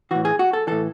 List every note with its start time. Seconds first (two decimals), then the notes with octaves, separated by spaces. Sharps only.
0.11 A2 E3 F#4
0.25 G#4
0.39 F#4
0.53 A4
0.67 A2 E3 A4